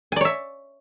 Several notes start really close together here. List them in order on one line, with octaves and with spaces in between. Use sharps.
G#5 D5 C#5 E5